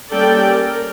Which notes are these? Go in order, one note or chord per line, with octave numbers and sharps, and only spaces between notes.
G3 A#3 C#4 A4 D5 G5
A#4